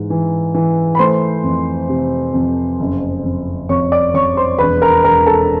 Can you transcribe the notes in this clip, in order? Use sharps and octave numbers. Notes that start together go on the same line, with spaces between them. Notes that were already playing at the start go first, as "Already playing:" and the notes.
Already playing: G#2 E3
E3
E3
B5
A3 C5 C6
F2
C3
F2
F#1
F2
F2 C#5 C#6
D5 D6
F2 C#5 C#6
C5 C6
E1 B4 B5
A#4 A#5
E1 A#4 A#5
A4 A5